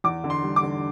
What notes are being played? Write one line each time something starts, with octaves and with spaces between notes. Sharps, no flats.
E2 D6
D3
C6
G3
D6
D3